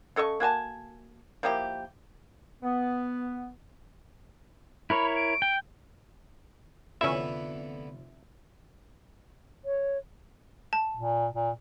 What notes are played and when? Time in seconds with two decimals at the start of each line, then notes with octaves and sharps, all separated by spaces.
0.16 C#3 A4 D#5 C#6
0.40 A#3 F#4 G#5 A5
1.43 F3 A#3 E4 G4
2.63 B3
4.90 E4 A#4 C#5 B5
5.16 D7
5.42 G5
7.01 F1 D3 E3 B3 C#4 E4 F4 E5
9.65 C#5
10.73 A5
10.97 A#2
11.34 A#2